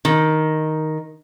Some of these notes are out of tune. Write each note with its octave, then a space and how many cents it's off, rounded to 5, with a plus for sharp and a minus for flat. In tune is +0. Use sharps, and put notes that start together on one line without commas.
D#3 +5